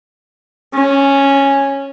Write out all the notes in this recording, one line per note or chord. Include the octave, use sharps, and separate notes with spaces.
C#4